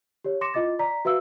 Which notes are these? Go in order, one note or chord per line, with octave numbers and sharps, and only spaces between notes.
G4 C#5
C6 D6 A#6 C#7 E7
E4 F4 D#5 D6 A6
D5 A#5 B6
F#4 B4 E5 F5 E6